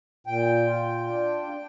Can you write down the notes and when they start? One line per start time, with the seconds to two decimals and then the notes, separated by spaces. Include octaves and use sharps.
0.27 A#2 G5
0.67 F4
1.07 D4
1.46 D4